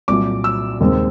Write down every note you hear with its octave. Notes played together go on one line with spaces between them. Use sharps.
C2 A#2 F#3 D6
E6
D#2 D#3 G#3 C4